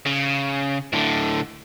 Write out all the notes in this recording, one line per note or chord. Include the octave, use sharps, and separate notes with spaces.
C#3
A2 D3